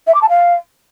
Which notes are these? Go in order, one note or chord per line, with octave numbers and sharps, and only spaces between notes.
E5
D6
A5
F5